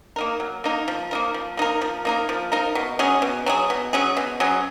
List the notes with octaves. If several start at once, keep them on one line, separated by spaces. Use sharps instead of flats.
A#3 D#4 A#4
F#3
A#3 D#4 A#4
F3
A#3 D#4 A#4
F3
A#3 D#4 A#4
F3
A#3 D#4 A#4
F3
A#3 D#4 A#4
B2
F#3 C#4 G#4
B2
F#3 C#4 G#4
B2
F#3 C#4 G#4
B2
F#3 C#4 G#4